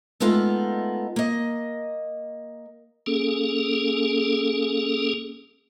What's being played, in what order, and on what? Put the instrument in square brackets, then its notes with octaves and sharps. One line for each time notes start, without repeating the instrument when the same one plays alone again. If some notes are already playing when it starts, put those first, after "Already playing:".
[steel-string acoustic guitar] G#3 A3 B3 D#4 F4 A4
A#3 D#5
[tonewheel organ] A#3 C#4 G#4 A4